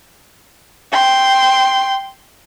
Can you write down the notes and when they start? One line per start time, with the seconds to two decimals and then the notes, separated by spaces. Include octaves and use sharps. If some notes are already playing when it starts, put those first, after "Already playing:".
0.92 G5 C6